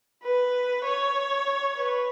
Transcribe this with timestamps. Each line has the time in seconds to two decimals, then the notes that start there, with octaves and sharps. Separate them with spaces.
0.23 B4
0.85 C#5
1.78 B4